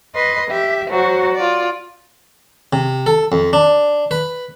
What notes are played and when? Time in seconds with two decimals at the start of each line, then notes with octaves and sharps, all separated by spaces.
0.14 B4 D#5 C6
0.48 G4 E5
0.89 F#3 F#4 C5
1.36 F4 D5
2.73 C3
3.06 A4
3.32 F2
3.53 D4
4.11 B4